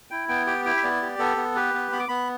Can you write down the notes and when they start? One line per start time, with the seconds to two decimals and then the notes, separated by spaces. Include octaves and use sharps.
0.11 E4 G5
0.29 B3 G5
0.47 G4 G5
0.65 E4 G5
0.77 E5
0.83 B3 D5
1.02 G4
1.19 B3 A4
1.37 B3
1.55 G4 B4
1.74 B3
1.92 B3 B5
1.99 D6
2.08 B3 B5